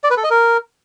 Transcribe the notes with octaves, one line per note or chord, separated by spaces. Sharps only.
D5
B4
A4
D#5
A#4